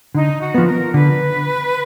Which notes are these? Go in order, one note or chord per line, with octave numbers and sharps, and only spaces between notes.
D3 D#4
F#4
F3 B3
A#4
D3 B4